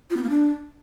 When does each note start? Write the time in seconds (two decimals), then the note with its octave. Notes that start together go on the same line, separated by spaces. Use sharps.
0.10 F4
0.17 B3
0.23 A#3
0.30 D4